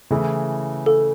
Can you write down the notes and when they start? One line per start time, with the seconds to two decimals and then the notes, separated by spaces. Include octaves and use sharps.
0.11 C#3 E3 A3 E4
0.86 A4